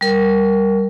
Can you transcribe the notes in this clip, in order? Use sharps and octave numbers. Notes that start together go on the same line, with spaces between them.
G3 A#4